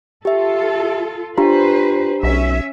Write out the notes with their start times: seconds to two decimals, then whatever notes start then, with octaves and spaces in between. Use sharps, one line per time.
0.25 F4 G4 A4 E5
1.38 D4 F4 G4 B4 C5 A#5
2.23 B1 C#4 E5